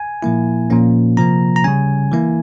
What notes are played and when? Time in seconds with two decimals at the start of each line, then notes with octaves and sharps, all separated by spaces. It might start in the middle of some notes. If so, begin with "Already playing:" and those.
Already playing: G#5
0.23 A#2 F3 A#3 E4
0.70 A#2 F3 A#3 C#4
1.17 C3 F3 A#3 A#5
1.56 A#5
1.64 C#3 G3 C#4 G#5
2.12 E3 A#3 E4